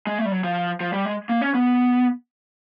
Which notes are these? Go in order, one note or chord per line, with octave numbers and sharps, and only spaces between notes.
G#3
A3
G3
F#3
F3
F3
G3
G#3
A#3
C#4
B3